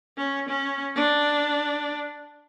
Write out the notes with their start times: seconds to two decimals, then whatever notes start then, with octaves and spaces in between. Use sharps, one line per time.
0.17 C#4
0.49 C#4
0.96 D4